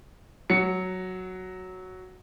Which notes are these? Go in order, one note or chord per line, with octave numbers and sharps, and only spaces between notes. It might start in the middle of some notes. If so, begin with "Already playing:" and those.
F#3 C#7